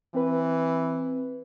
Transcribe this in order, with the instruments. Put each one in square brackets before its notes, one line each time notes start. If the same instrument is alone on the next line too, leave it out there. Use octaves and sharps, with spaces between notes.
[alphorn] E3 [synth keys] C4 B4